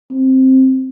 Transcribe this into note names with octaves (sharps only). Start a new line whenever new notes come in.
C4